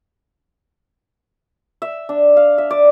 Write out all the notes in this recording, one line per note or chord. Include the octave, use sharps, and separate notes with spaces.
E5
D4
F5
E5
D5